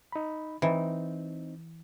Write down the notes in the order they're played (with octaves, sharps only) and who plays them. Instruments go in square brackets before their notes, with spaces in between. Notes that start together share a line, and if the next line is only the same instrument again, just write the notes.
[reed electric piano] D#4 B5
[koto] E3 [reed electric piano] C4 D#4